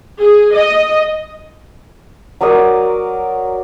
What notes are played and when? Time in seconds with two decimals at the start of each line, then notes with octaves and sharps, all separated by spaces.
0.21 G#4
0.55 D#5
2.41 F#3 A#4 D5 D#6